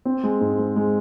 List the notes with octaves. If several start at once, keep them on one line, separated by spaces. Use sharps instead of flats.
C4
G#3
G#2
G#3
G#3